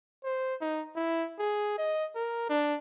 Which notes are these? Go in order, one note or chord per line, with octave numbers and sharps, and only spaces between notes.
C5
D#4
E4
G#4
D#5
A#4
D4